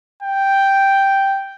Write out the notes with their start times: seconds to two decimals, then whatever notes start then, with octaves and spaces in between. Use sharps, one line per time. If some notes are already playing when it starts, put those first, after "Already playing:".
0.23 G5